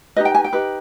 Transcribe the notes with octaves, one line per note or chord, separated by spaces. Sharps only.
D#4 G4 B4 D#5
G5
G#5
G5
D#4 G4 B4